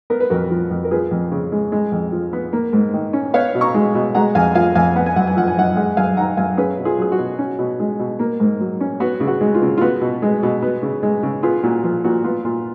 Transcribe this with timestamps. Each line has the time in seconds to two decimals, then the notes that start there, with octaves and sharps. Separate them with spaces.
0.10 B3 A#4
0.20 B4
0.30 F2 F#4 A#4
0.50 F3
0.71 F2
0.85 A#4
0.91 F3 G#4 B4
1.11 F2
1.31 C#3
1.52 G#3
1.72 G#3
1.92 F2
2.12 F3
2.33 B3
2.53 A#3
2.73 G#2
2.94 D#3
3.13 C#4
3.34 B3 C#5 F5
3.55 B2
3.61 A#5 C#6
3.74 G#3
3.95 B2
4.15 G#3 F#5 A#5
4.35 F2 F5 G#5
4.55 F3 F5 G#5
4.75 F2 F5 G#5
4.96 B3 F#5
5.06 G#5
5.16 F#2 F#5
5.27 G#5
5.37 F3 F#5
5.48 G#5
5.57 F#2 D#5 F#5
5.77 G#3 D#5 F#5
5.97 F#2 F5 G#5
6.17 D#3 F#5 A#5
6.37 F#2 F5 G#5
6.57 C#4 G#4 B4
6.78 B2
6.85 F4 G#4
6.98 F#3 G#4
7.12 F#4
7.18 B2
7.39 C#4
7.58 B2
7.79 G#3
7.99 B2
8.19 A#3
8.40 G#2
8.61 F#3
8.81 C#4
9.00 B3 F#4
9.20 C#3
9.28 F#4
9.41 G#3
9.54 F4
9.62 C#3
9.78 F4
9.81 B3 F#4
10.01 B2
10.22 G#3
10.43 B2
10.62 B3
10.82 C#3
11.03 G#3
11.23 C#3
11.43 B3 F4 G#4
11.63 A#2 F#4
11.83 F3 F4
12.04 A#2 F#4
12.24 B3 F4
12.45 A#2 F4